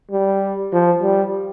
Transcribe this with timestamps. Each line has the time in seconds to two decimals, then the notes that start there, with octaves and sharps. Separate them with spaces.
0.11 G3
0.73 F3
1.02 G3